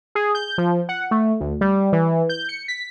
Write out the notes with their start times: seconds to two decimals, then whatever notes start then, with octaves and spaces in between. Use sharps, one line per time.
0.15 G#4
0.35 G6
0.58 F3
0.89 F#5
1.11 A3
1.40 D2
1.61 G3
1.93 E3
2.29 G6
2.49 C#7
2.68 B6